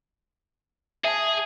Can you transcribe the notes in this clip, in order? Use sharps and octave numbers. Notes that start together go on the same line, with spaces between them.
G#4 E5 A5